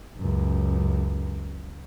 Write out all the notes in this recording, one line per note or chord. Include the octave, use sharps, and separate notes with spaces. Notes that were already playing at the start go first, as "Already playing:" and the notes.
C#2 F#2